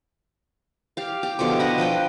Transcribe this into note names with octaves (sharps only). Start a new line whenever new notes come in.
G4 F5
G4
B2 D3 F3 D6
D4 D#5 F#5 B5
F3 B4 G5 C6